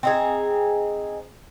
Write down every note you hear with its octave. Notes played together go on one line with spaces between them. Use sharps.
C4 D#4 G#4